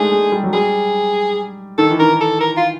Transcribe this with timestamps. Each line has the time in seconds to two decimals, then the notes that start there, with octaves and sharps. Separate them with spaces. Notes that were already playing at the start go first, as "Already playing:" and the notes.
Already playing: G#3 A3 D4 D#4 G#4
0.12 G#3
0.32 G3
0.43 F#3
0.53 G3 G#4
1.78 D#3 A4
1.90 E3
1.99 D#3 A#4
2.21 A4
2.40 A#4
2.57 F4